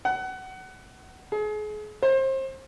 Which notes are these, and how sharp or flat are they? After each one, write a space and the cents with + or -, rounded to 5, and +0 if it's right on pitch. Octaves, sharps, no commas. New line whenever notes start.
F#5 +25
G#4 +35
C5 +30